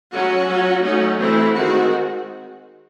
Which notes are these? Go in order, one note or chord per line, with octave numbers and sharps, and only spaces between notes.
F#3 C#4 F#4
F#3 C#4
F#3 A3 C#4 D#4
E3 A3 C4 E4
D#3 G#3 C4 F#4